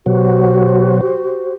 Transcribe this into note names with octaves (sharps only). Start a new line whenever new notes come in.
B2 F#3 F#4 G4 C5